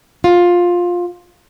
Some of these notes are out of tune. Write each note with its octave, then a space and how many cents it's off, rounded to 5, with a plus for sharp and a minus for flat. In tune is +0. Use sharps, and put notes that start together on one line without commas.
F4 +15